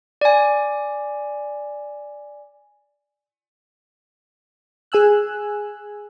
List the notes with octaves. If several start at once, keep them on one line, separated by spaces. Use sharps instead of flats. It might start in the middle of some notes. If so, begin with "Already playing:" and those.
D5 G#5
G#4 G#5 E6 F#6